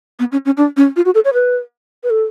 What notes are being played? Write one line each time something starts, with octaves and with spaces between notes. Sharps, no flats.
B3
C#4
C#4
D4
C#4
F4
F#4
A4
C#5
B4
B4
A4